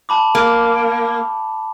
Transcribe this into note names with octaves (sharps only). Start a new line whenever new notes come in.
A5 B5 D6
A#3